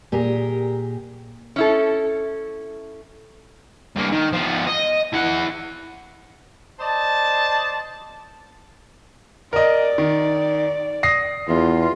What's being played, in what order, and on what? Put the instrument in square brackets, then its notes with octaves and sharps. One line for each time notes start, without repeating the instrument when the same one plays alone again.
[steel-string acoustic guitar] A#2 G4 G#4 A#4
[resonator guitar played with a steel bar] C#4 E4 A4
[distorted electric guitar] G2 A#3
D#3
F3 B3
D#5
E4 F#5
[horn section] C5 D5 D#5 A5
[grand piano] A#4 D#5 [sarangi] D5
[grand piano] D#3
D#6 A#6 C7
[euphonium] E2 [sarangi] F4